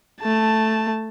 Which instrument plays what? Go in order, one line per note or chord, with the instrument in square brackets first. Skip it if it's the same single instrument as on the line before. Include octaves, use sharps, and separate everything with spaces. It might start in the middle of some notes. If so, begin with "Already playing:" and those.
[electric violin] A3 A5